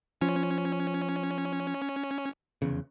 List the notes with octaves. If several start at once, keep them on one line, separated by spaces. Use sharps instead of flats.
F3 C#4
F1 E2 C#3